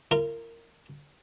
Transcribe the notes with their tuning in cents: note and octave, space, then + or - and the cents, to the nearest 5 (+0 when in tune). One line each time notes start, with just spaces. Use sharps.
F4 -40 A#4 -20